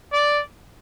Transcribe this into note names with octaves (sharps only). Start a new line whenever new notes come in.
D5